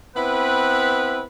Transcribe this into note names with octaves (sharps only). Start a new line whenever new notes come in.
B3 C4 E4 B4